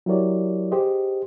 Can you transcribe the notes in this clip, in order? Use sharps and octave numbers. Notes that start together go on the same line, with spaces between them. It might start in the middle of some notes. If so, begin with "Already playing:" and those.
F#3 E4 G4 A#4 C#5 D5
G4 G#4 C5 D#5